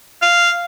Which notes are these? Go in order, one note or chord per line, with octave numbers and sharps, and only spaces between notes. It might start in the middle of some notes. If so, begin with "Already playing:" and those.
F5